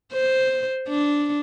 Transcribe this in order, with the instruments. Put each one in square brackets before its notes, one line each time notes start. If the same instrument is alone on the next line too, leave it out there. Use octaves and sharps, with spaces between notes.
[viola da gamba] C5
D4